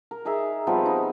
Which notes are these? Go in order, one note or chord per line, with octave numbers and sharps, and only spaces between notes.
A#4
D#4 G#4 A#4 E5
F3 G3 B3 C4
D#4